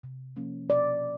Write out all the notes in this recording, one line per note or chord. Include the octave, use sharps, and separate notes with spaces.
C3
F3 A#3 C#4
B2 D5